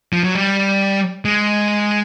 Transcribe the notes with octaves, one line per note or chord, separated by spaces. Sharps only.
F3
F#3
G3
G#3